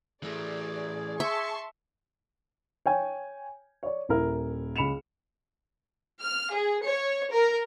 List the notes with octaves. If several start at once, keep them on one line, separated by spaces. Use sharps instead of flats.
E3 A3 G#4 D5
E5 A5 C6 C#6
C#5 G5 G#5
C#5 D5
D#1 E4 A#4
C#2 B5 C#7 E7 F7
F6
G#4
C#5
A#4